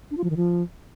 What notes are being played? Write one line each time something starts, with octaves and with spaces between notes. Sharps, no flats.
D4
F4
F3
D#3
F3